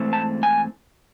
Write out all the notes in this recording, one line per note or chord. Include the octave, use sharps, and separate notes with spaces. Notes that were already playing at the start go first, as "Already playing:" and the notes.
Already playing: G#2 E3 A3 C4
A5
G#5